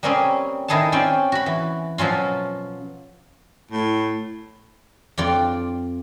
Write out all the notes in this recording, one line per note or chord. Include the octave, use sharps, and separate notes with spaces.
G3 A#3 C4 C#4 G#4
D#3 E4 G#4 A4 A5
C4 C#4 F4 D5 G5
F#4 B5
E3
B2 F3 F#3 C#4 F4
A2
F2 F4 D5